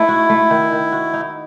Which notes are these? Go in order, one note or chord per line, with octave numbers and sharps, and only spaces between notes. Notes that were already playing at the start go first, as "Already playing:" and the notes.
Already playing: A3 D#4 E4
F#4
A3
D#3
D#3
F#4
D#4